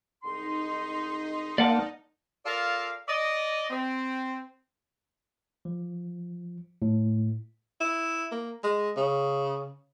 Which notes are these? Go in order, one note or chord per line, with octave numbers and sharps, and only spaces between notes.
C2 G#2 D#4 C6
A#3 D5 F#5 A5
F4 A4 A#4 D5 F5
D5 D#5
C4
F3
A2
E4
A#3
G#3
C#3